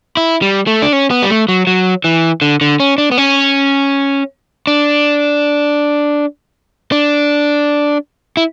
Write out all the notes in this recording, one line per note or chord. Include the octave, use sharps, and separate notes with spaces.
E4
G3
A3
D4
C#4
B3
G3
A3
F#3
F#3
E3
D3
D3
C#4
D4
B3
C#4
D4
D4
E4